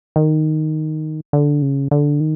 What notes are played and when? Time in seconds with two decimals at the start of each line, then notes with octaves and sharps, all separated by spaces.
0.16 D#3
1.33 D3
1.62 C#3
1.91 D3
2.20 D#3